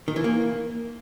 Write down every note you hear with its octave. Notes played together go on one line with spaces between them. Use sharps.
D#3
E3
A#3